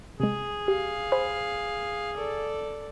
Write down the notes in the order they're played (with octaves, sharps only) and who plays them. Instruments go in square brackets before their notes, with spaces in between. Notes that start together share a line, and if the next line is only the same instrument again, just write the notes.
[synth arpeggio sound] C3 G#3 [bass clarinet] G#4
[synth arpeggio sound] G4 [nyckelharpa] F5
[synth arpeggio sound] C5 G#5 B5
[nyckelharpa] A4 D5